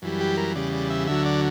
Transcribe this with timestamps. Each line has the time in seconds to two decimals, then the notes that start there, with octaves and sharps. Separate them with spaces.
0.02 F#2 E3 G3
0.21 G4
0.37 A#4
0.55 E2 C#3 G3 D5
0.73 D5
0.90 E5
1.08 D2 D3 F#3 E5
1.26 D5